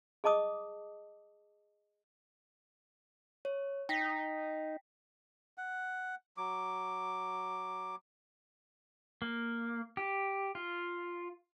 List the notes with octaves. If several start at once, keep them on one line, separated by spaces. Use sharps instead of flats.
G#4 D#5 A5 D6 D#6
C#5
D#4 G5 A#6 B6
F#5
F#3 D6
A#3
G4
F4